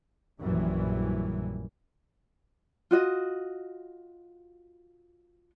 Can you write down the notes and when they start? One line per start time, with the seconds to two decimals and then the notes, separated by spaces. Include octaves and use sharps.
0.42 A#1 F#2 E3 G3
2.91 F4 F#4 D#5